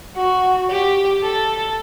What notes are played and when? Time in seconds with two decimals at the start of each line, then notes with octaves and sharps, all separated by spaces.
0.16 F#4
0.70 G4
1.23 A4